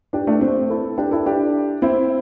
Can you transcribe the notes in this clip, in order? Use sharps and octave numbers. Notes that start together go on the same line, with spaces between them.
D4 G4
A3 D4
C4
E4 A4
D4 G4
E4 A4
D4 G4
C4 E4